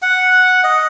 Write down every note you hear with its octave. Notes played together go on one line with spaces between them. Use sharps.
F#5
D#5